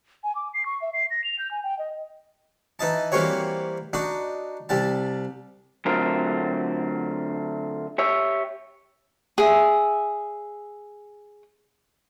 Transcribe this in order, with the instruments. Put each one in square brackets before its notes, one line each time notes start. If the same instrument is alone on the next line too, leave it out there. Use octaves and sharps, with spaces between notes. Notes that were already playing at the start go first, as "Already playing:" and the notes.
[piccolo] G#5
D6
C7
C#6
E5
C7
A#6
F7
G6
G#5
G5
D#5
[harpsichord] E3 D#4 D#5 A5
E3 G3 A#3 C4 F#4 C#5
D4 D#4 F#4
C2 G3 A5
[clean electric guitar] D3 F#3 A3 C4 F4 A#4
G4 C#5 E5
[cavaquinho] G#4 E5